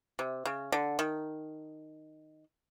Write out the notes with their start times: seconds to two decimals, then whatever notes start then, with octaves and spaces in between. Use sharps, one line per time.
0.19 C3
0.45 C#3
0.72 D3
0.99 D#3